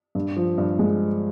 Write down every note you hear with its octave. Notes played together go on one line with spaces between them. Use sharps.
G2
F3
G2
G#3